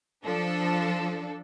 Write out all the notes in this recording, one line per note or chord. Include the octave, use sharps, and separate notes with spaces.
F3 D4 A4